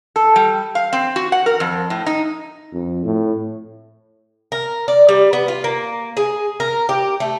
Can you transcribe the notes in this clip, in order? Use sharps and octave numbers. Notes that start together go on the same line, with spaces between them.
A4
G3
F5
C4
F#4
F#5
A#4
F2
A2
D#4
F2
A2
A#4
D5
G3
B3
F4
A#3
G#4
A#4
G4
A3